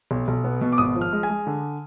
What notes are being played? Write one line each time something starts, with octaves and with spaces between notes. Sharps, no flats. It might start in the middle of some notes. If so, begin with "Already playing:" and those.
B1
B1
B3
B2
D6
G#1 D#6
F3
F6
G#3
G#5
G#3
D3